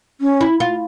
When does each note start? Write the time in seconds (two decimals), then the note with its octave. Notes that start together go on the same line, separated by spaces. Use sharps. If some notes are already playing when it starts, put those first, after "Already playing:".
0.21 C#4
0.41 E4
0.60 F4